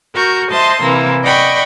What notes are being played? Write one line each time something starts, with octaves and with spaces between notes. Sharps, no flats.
F#4 A#4 C#6 G6
C5 D#5 E5 A5 C6
C3 E3 A#3 E4
D5 D#5 F#5 G5 B5 C#6